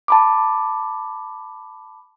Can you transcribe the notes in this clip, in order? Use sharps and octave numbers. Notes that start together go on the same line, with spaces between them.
A5 B5 D6